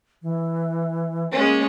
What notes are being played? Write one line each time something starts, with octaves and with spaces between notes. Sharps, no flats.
E3
G#3 A#3 C#4